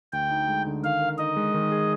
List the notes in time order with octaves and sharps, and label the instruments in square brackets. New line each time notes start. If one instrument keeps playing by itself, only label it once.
[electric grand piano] D2 [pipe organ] G5
[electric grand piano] D#4
G#3
D3
[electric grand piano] D#3 [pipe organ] F5
[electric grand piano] A#4
[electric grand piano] D#4 [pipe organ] D#5
[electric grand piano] G#3
D#3
G#4